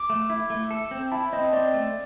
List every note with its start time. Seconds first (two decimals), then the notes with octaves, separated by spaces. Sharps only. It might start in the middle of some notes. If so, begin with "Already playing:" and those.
Already playing: D6
0.10 A3
0.30 E4
0.50 A3
0.71 A4
0.91 C4
1.12 E4 A5
1.33 C4 D#5
1.53 C4 D5
1.74 A3